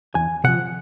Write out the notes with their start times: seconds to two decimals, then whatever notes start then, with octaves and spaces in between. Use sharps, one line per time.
0.15 E2 G#5
0.44 C3 F3 F#5